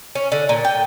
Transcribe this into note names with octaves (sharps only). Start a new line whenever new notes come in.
C#4
D3
A#2
G5